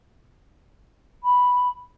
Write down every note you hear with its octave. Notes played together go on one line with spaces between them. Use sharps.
B5